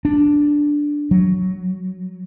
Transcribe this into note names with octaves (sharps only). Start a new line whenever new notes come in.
D4
F#3